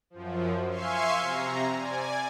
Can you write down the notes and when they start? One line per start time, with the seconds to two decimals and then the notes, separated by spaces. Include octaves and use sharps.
0.10 F#2 F3
0.68 E5 F5 G#5 C6 C#6
1.21 C3 A#5
1.76 D5 G#5